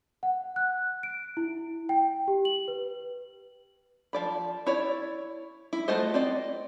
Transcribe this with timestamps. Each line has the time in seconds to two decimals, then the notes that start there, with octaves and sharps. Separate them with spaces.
0.23 F#5
0.56 F#6
1.03 D7
1.37 E4
1.89 G5
2.28 G4
2.45 F#7
2.68 B4
4.13 F3 D5 B5
4.67 E4 C#5 D5
5.73 E4
5.88 A3 F4 F#4 C5 D#5
6.14 C4 D5 D#5